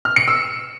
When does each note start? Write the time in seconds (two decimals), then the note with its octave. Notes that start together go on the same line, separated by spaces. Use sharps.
0.05 F6
0.16 C#7
0.28 E6